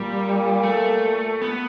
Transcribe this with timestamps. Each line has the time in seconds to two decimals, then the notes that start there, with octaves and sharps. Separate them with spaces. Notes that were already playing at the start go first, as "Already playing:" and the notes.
Already playing: A#2 G3
0.63 A3
1.42 B3